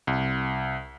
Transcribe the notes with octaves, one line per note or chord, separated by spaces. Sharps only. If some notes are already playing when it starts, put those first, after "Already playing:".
C2